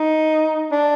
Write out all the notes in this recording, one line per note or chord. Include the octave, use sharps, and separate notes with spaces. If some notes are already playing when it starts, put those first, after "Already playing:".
Already playing: D#4
D4